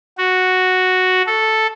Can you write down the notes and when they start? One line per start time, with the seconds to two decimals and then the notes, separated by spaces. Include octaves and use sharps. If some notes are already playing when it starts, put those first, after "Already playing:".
0.18 F#4
1.27 A4